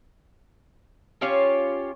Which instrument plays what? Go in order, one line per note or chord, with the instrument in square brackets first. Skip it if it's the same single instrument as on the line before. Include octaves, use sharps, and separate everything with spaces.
[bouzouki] C#4 F4 G4 C#5